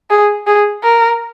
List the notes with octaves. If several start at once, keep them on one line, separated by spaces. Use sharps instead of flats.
G#4
G#4
A#4